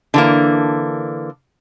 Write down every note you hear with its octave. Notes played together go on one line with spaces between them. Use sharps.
D3 E3 A#3